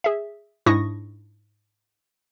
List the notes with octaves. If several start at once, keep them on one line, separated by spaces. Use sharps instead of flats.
G#4 E5
G#2 D4 E4 C#6 D#6 A#6